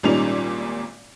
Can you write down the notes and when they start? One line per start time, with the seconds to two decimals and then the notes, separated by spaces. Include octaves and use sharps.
0.03 G#1 A#2 G3 C#4 D#4 F7